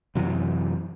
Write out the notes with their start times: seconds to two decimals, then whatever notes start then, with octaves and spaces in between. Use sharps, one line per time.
0.15 F#2 C3 E3